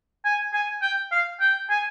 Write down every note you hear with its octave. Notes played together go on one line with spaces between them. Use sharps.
G#5
G#5
G5
F5
G5
G#5